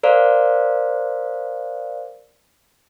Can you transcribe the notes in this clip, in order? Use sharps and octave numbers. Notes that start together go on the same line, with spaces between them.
A#4 C5 D5 F5